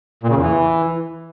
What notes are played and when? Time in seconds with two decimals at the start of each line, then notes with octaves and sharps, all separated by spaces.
0.23 A#2
0.30 C#3
0.36 E2
0.42 E3